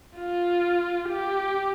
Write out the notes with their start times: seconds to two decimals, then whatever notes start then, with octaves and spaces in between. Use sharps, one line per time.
0.16 F4
1.10 G4